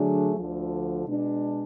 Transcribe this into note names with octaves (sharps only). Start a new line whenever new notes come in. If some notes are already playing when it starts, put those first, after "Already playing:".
Already playing: D3 F#3 A3 D4 G#4
D2 D3 F3
B2 G#3 D4